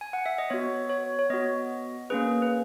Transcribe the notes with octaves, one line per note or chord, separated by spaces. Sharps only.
G#5
F#5
E5
D#5
B3 F#4 C#5
C#5
C#5
B3 F#4 D#5
A#3 C#4 G#4 B4
B4